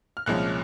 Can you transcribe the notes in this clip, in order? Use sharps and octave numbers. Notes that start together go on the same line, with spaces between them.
F6
C2 A#2 F3 G#3 C#4 F#6